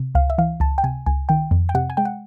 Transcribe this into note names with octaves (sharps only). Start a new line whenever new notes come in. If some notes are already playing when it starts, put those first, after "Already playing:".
Already playing: C3
C#2 F5
E5
E3 F5
C#2 A5
G5
C3 G#5
C#2 G#5
D#3 G5
F2
G5
C3 F#5
G#5
G#3 G5
F#5